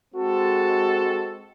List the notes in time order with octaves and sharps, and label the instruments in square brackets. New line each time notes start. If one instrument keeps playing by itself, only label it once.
[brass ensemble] G#3 C4 F#4 A4